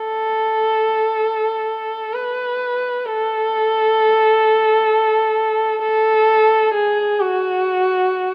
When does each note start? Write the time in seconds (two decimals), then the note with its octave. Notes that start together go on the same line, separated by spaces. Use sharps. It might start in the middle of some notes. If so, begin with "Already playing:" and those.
Already playing: A4
2.14 B4
3.06 A4
5.82 A4
6.74 G#4
7.20 F#4